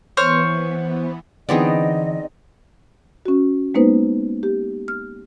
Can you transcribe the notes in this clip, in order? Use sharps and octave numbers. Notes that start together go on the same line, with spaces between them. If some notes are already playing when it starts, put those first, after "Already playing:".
E3 B3 C5 C#5 F6
D3 E3 B3 C4 D#4 G#4 D5 D#5
C#4 F#4
G#3 A#3 B3 D#4 B4 C5
G4
F6